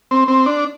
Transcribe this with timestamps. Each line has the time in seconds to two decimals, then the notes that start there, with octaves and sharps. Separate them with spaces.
0.11 C4
0.28 C4
0.46 D4